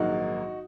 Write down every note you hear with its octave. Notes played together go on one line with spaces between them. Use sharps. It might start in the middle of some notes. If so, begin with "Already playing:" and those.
Already playing: A#1 G#2 D#3 F#3 A#3 D#4 F#4